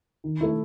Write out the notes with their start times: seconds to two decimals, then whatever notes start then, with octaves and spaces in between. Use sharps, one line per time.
0.24 D#3
0.41 A3 E4